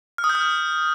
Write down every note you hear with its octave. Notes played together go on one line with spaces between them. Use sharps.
F6
D#6
G6
F6